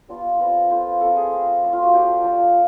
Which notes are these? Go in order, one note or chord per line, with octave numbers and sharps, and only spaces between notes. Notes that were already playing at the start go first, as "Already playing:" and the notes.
G3 B3 D4 F4
A3 C4 F4 B4
A3 C4 F4 C5
B4
A3 C4 F4 A4
G#4
A3 C4 F4
F3 A3 D4 F4
F4
F#4
F3 A3 D4 F4 G4
F3 A3 D4 F4